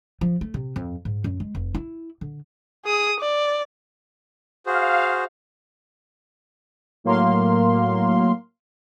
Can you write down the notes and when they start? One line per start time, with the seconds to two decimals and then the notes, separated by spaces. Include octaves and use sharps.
0.21 F3
0.41 A3
0.54 C3
0.76 F2
1.05 G#2
1.24 F#2
1.40 G#3
1.55 F1
1.75 E4
2.21 D3
2.85 G#4 D#6
3.20 D5
4.66 F#4 G#4 C5 F5
7.04 A2 F#3 A#3 F5 C6